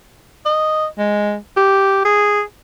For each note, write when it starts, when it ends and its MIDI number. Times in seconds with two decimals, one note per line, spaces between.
0.45 0.86 75
0.99 1.36 56
1.57 2.03 67
2.05 2.42 68